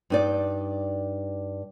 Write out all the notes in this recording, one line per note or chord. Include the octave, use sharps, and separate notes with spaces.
G2 D#4 D5